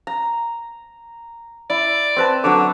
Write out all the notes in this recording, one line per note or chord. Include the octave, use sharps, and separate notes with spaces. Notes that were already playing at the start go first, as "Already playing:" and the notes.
A#5
E4 D5
C4 B4 A5
D3 F#3 D4 D6